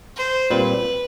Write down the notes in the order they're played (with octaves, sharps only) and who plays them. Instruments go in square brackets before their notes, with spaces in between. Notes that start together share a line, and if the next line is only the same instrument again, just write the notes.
[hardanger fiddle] C5
[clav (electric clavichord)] A#2 G3 C4 [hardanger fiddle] B4